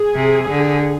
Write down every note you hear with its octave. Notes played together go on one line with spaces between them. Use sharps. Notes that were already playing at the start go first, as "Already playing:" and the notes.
Already playing: G#4
C3
D3